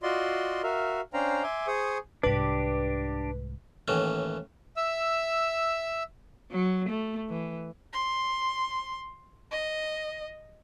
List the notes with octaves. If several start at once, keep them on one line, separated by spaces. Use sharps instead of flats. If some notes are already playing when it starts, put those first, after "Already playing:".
F4 F#4 D5 D#5 C6
F#4 A#4 E5 F5
C#4 D4 C5 F5 G5 A#5
E5 G#5 C6 D6
G#4 C5 C#6 D#6
C2 G#2 D4 G4 B4
D#2 A2 E3 C#4
E5 E6
F#3
A3
E3
C6
D#5